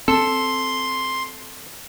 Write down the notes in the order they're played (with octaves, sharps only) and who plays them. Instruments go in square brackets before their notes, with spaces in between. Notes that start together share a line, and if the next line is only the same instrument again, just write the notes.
[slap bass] C4 [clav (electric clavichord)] A4 [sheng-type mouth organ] C6